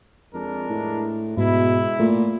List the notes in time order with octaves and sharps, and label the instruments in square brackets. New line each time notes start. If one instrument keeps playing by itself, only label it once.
[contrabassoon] F2 [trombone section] G#3 D4 A#4
[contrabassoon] A2
[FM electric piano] G#2 [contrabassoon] B2 [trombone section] G#3 E4
[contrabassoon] A#2 [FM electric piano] A3